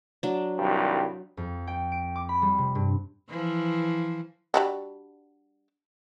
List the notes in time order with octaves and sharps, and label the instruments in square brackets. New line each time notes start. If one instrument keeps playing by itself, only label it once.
[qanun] F#3 D4
[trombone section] C2 G2 D#3
[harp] F2
G5
D7
D6
B5
G3
C3
G2
[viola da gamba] E3 F3
[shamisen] G3 D4 F#4